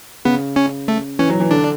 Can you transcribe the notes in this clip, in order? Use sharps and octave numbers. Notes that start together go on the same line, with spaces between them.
C#3 B3
C#4
A3
E3 C#4
F#3
E3
D3 D4